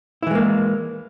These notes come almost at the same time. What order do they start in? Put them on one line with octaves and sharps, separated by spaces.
E4 E3 G#3 A#3